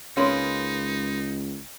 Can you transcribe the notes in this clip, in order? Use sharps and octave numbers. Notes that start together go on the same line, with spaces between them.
C#2 G#3 A#3 C#4 D#4 B4